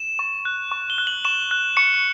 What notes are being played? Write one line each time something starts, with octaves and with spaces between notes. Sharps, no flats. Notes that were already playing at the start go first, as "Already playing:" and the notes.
Already playing: E7
C#6
F#6
C#6
G7
F#6
F#7
C#6 E7
F#6
C#6 C#7